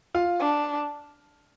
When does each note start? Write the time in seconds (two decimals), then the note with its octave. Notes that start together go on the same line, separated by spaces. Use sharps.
0.14 F4 F5
0.40 D4